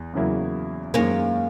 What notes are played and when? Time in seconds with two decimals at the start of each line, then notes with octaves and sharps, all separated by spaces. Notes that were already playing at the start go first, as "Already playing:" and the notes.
Already playing: E2
0.13 E2 C#3 F#3 A#3 E4
0.94 F#2 D#3 G#3 A#3 C#4